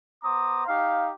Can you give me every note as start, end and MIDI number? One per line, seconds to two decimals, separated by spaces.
0.24 0.65 59
0.24 0.65 72
0.24 0.65 82
0.24 0.65 86
0.24 0.65 87
0.67 1.11 63
0.67 1.11 67
0.67 1.11 77